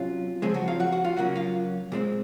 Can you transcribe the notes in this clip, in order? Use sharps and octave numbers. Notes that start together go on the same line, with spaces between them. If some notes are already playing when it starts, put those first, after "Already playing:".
Already playing: C3 F#3 C#4 F4
C#3 F3 G#3 C4 G#4
F#3 F#4
F4 F5
F#4 F#5
F#4 F#5
F4 F5
C#3 F#3 A#3 C#4 F#4 F#5
F4 F5
A#2 G#3 C4